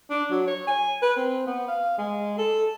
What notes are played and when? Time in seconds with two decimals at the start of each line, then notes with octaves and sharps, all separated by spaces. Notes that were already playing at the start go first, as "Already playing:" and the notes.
0.10 D4
0.31 F#3
0.47 C#5
0.67 G#5
1.02 B4
1.17 C4
1.47 B3
1.68 F5
1.98 G#3
2.38 A4